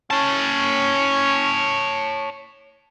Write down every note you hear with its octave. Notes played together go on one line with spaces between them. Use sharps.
C#4 C#5 A5